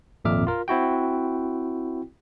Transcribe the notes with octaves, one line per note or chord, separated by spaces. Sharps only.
G#1 F2 A#2 E5 D6 F6
F4 A#4
C4 E4 F#4 G5